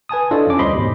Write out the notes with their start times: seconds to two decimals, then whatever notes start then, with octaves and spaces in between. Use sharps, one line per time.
0.09 B4 G#5 A5 D#6
0.31 D4 E4 F4 A4 C#5 D#5
0.47 F2 C#4 D6
0.59 D2 G3 C5 D#5 B5 C6
0.74 E2 G#2 B2